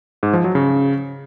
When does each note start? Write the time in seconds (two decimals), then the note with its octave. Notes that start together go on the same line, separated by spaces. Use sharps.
0.23 G#2
0.33 F3
0.44 F#3
0.55 C#3